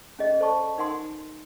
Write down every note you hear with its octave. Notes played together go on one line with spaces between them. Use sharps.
C#4 G#4 D#5
A4 C5 D5 A5 C#6
D#4 A#4 F#5 G#5 C6 D#6